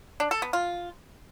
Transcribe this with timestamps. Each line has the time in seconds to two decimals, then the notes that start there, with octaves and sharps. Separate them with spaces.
0.20 D4
0.31 A4
0.42 B3
0.53 F4